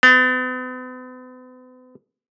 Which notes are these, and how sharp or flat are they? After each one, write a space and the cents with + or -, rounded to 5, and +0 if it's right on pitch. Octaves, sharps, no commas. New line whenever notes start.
B3 +45